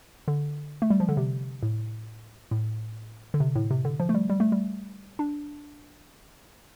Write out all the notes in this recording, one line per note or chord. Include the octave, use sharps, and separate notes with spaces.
D3
A3
G3
F3
D3
C3
A2
A2
D3
C3
A2
C3
D3
F3
A3
G3
G3
A3
G3
D4